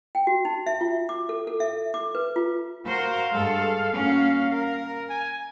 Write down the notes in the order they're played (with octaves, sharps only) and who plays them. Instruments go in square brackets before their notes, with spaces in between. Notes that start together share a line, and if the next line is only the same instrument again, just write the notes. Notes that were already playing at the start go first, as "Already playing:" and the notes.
[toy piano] G5
F#4
D#4
E5
F4
D6
A4
A4
E5
D6
B4
F4
[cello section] F#4 A#4 C5 [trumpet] F5
[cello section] G2 G#3 A4
A#3 C#4 F#4
A#4
[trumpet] G#5